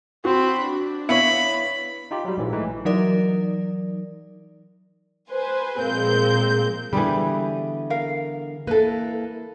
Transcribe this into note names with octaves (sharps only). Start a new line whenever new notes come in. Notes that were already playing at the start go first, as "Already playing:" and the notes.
C4 F#4 B5
D4
B3 E4 C#5 F5 B5 C#7
D#4 F4 G4
F#3 G3
A#1 G#2 E3
E3 A3 D#4
E3 F#3 D#4 A#4 D5
B4 C5 G#5
A#2 F3 G#3 A#3 C4 G6
D3 E3 G3 B3 G#4
A#4 F5
A#3 E4 A4 B4